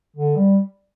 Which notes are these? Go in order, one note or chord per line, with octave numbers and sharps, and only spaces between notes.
D3
G3